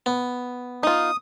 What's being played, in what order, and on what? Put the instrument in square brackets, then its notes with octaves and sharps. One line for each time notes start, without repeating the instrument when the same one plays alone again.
[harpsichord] B3
[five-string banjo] D#4 F4 [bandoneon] D#6